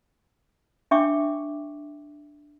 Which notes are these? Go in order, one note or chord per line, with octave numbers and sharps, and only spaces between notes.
D4 E5 G5 C#6 D6